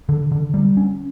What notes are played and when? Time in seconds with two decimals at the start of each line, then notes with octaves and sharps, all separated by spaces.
0.09 D3
0.32 D3
0.54 G3
0.77 C#4